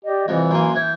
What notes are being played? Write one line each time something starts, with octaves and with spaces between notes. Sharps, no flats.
G4 D5 D#5
C2 F2 E3
F#2 A#3 G#5 A#5 C6
E3 G6 G#6